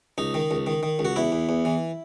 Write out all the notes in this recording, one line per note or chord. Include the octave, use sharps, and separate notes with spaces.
C#2 D#4
D#3
C#2
D#3
D#3
C#2
F#4
E2 E4
E2
E2
E3